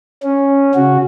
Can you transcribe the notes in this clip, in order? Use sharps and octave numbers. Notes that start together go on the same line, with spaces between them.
C#4
C#3 F#4